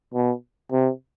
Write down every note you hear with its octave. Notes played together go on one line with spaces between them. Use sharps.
B2
C3